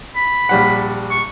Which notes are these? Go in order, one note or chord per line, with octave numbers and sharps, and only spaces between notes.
B5
A#1 G3 F#5
C#6